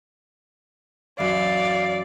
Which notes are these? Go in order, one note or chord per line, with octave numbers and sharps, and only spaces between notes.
F#2 E3 D5 F5